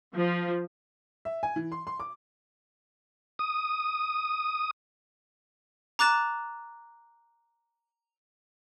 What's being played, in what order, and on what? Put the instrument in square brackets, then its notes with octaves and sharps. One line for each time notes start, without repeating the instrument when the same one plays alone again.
[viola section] F3
[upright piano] E5
G#5
E3
C6
C6
D6
[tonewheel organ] D#6
[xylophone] A#5 D6 F#6 A6 E7